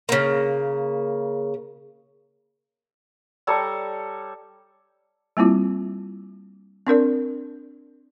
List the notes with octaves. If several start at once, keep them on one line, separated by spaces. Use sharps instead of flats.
C#3 A#3
G3 A4 C#5 A#5
G3 A#3 C4 E4 F4
C4 D4 A#4 D5